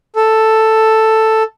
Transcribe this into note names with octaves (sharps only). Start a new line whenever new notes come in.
A4